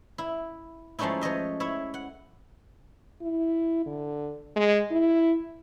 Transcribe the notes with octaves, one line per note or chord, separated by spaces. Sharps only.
E4
F3 G#3 A3 C#4 D#4 E4
F3 C#5 D#5 E5
E4 C#5 E5
F#5
E4
D3
G#3
E4